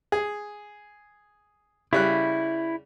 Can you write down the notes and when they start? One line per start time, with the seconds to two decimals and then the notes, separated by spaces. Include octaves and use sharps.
0.12 G#4
1.93 C#3 G3 E4 F#6